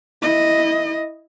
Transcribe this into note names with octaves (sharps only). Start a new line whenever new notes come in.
E4 D#5